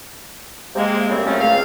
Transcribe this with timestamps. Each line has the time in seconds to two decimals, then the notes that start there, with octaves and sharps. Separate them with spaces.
0.76 C3 G#3 A#3
1.09 F#2 A2 C#3 G3 C4
1.25 F#2 F3 F#3 A3 C4 C#4
1.40 C#2 F5